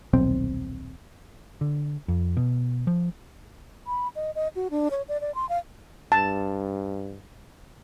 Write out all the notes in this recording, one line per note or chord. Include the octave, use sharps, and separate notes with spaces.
D#1 B1 C4
D3
F2
B2
F3
B5
D#5
D#5
F#4
D4
C#5
D5
D5
C6
F5
G2 A5